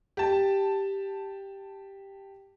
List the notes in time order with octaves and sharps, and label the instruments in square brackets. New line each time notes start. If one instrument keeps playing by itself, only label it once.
[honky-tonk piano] G4 A5